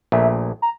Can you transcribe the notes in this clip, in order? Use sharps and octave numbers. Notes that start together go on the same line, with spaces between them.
A#1 A#2 A3 E5
A#5